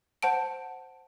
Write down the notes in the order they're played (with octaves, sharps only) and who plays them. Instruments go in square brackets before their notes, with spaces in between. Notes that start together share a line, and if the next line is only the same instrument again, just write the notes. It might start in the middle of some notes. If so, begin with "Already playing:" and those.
[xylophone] C5 F#5 A5 D7